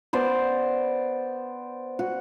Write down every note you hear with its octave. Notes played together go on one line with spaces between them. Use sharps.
B3 C5 D5
F#4